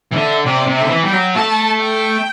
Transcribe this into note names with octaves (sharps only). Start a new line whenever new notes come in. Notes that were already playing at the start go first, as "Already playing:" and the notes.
E3
D3 E5
C3 D5
C3
E5
D3
E3
G3 G5
F#3
A3 A5
G5